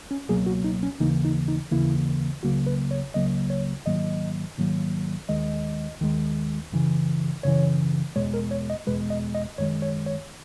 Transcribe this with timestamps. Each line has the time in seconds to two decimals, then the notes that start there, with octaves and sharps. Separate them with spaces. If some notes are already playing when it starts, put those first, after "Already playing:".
0.11 C#4
0.29 C#2 B2 F#3 A#3 G#4
0.46 F#4
0.64 D#4
0.83 C#4
1.00 D#2 C#3 E3 A#3 D#4
1.25 D#4
1.48 D#4
1.71 D#2 C#3 E3 A#3 E4
2.43 C#2 C#3 F#3 A#3 F#4
2.66 B4
2.91 C#5
3.14 C#2 C#3 F#3 A#3 D#5
3.50 C#5
3.86 G#2 D#3 F#3 A#3 D#5
4.58 G#2 D#3 F#3 A#3
5.29 D#2 D#3 G#3 D#5
6.01 D#2 D#3 G#3
6.72 F#2 C#3 E3
7.43 F#2 C#3 E3 C#5
8.16 E2 B2 G#3 C#5
8.34 A#4
8.51 C#5
8.70 D#5
8.87 E2 B2 G#3 B4
9.10 D#5
9.35 D#5
9.58 F#2 D#3 G#3 C#5
9.82 C#5
10.06 C#5